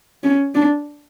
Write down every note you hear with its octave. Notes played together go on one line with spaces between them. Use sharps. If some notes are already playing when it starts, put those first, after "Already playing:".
C#4
D4